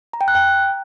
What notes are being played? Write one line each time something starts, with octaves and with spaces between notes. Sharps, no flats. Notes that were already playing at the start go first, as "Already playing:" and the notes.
A#5
G5
F#6
G5